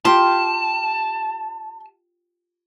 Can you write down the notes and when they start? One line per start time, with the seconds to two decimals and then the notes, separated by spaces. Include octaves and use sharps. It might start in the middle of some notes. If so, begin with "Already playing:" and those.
0.05 F4 G4 A5 C6